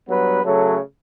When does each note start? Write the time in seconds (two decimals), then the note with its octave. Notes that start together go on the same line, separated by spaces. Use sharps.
0.08 G2 F#3 B3 B4
0.44 C#3 F#3 A3 A4